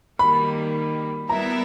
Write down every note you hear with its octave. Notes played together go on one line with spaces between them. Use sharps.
D#3 G3 A#3 B5
G3 B3 E4 A#4 E5 A#5